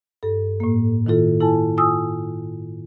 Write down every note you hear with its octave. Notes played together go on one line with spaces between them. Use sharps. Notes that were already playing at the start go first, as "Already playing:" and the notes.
G2 A4
A2 A#3
D#3 E4 F4 A4
E4 A4 G#5 A5
F4 G#5 D#6 E6